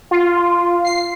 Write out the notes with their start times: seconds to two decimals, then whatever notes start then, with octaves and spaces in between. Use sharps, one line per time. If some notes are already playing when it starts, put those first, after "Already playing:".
0.11 F4
0.85 C7